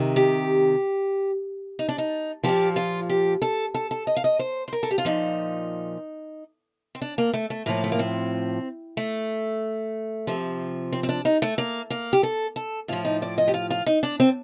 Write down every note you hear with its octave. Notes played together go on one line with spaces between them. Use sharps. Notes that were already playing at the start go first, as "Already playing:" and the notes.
Already playing: C3 D#3
G4
D#4
D4
D#4
A#2 F3 G4
F4
G4
A4
A4
A4
D#5
F5
D#5
C5
C5
A#4
A4
G4
F4
A#2 F3 D#4
C4
D4
A#3
A3
A3
A2 F3 A#3
A3
A#3
C4
A3
C3 F3
C4
C4
D4
D#4
A3
A#3
A#3
G4
A4
A4
A2 F3 F4
D#4
D5
D#5
G4
F4
F4
D#4
D4
C4